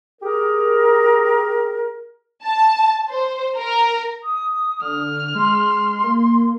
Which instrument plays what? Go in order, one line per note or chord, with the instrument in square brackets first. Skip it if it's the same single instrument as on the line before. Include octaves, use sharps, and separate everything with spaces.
[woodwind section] G4 G#4 A#4
[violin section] A5
C5
A#4
[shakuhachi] D#6
[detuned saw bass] D3 [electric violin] F6
[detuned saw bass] G#3 [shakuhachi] C6
[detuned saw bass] A#3